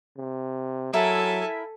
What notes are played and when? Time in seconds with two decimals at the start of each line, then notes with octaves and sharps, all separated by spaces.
0.17 C3
0.93 F#3 E4 A4 A#4 E5 G#5